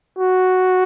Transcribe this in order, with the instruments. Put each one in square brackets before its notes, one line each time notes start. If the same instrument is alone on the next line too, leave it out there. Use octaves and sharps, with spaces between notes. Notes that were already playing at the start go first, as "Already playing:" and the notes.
[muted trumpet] F#4